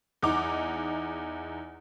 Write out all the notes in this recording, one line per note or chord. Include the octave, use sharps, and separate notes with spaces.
E2 D#4 D6